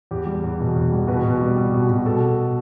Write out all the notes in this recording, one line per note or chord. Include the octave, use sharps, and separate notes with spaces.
E2 G4
G3
E2
B2
E2
G3
B2 B4
B2
G3
G3
B2
B2
B2 A4